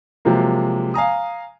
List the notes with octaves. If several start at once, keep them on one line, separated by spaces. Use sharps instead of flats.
C3 F3 F#3 G#3 A#3
F5 G#5 A#5 D#6